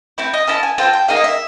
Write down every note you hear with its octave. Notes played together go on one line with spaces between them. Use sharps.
A3 C4 E4
D#5
C#4 E4 A4 A5
G#5
C4 F4 A4 G5
G5
A#3 D#4 G#4 F5
D#5
E5